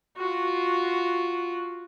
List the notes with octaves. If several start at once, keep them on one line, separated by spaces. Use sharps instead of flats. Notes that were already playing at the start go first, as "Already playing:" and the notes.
F4 F#4